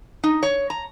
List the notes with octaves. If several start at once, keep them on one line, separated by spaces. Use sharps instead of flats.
D#4
C#5
A#5